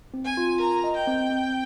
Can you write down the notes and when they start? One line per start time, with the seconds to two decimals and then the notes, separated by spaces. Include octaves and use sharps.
0.14 C4
0.25 G#5
0.37 F4
0.60 A#4 A#5
0.84 D#5
0.96 G5
1.07 C4
1.30 C4